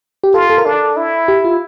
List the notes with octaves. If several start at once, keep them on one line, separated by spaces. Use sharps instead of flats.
G4
F4 A4
A4
A#4
D4 A4
E4
G4
F4